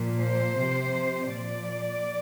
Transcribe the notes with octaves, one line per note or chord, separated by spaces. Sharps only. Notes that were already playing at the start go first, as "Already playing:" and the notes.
Already playing: A#2 F3
C5
C3 F3
A#2 F3 D5